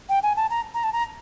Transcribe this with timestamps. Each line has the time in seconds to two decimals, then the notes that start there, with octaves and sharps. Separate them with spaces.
0.09 G5
0.23 G#5
0.36 A5
0.50 A#5
0.74 A#5
0.84 A5
0.93 A#5